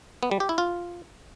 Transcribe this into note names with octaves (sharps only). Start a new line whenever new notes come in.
B3
G3
G4
E4
F4